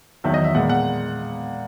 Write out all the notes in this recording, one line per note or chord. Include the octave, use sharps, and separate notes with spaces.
E2 D#3 F#3 E5
D#5
E5
A#2 G#3 B3 F#5
F#5